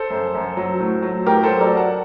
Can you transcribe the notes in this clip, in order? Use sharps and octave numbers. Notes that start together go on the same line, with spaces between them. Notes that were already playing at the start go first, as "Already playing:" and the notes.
Already playing: A4 C5
F#2
F#2
F#3
A2
F#3
A2 G4 A#4
F#3 A4 C5
A#4 D5
F#3
F#5 A5